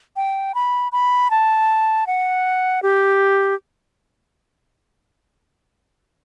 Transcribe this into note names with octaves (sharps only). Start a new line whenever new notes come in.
G5
B5
B5
A5
F#5
G4